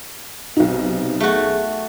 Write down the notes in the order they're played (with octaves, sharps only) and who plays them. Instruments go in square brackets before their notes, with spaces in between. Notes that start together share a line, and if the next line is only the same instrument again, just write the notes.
[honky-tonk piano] B1 D#4 [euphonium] C3
[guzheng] A3 F#4 [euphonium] G#4